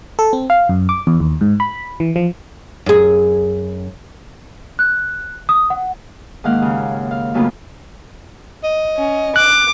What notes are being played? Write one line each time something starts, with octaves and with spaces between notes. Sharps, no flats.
A4
C4
F5
F#2
D6
E2
D#2
G#2
B5
E3
F3
F#2 G#4
F#6
D#6
F#5
G#2 D#3 A#3 F5 F#5
D#2 C#3
F5
F#2 A2 C#3 A#3 B3 F4
D#5
C#4
D6 F#6